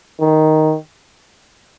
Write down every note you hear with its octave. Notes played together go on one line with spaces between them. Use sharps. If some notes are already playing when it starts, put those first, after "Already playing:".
D#3